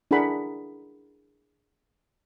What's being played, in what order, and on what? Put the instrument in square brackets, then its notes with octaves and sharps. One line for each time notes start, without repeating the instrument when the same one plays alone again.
[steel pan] D4 E4 G#4 A#4 F#5 B5